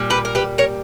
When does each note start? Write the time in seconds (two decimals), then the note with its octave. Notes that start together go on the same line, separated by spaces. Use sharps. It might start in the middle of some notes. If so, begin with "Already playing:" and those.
Already playing: A#2 G3
0.10 G4 B4
0.25 A#4
0.35 G4 B4
0.58 A#4 C#5